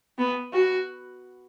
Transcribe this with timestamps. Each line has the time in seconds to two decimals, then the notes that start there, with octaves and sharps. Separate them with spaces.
0.18 B3
0.53 F#4